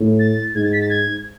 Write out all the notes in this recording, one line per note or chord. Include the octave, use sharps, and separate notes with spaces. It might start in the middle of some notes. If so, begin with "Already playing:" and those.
Already playing: A2
A6
G#2 G#6
A6
B6
A6
G#6